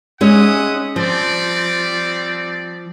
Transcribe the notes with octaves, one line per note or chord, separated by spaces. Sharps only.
G#3 C#4 D#4 E5 F#5 D#6
F3 G3 C4 D5